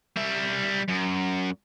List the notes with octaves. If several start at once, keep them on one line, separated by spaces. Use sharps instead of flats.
G3 E5
F#2